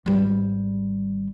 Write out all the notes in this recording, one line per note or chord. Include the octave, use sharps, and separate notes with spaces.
G#1 G3